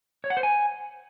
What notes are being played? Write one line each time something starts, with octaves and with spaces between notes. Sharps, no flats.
C#5
F#5
C5
G#5